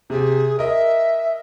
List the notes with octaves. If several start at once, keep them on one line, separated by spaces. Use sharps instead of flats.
C3 G4 G#4
A#4 D#5 E5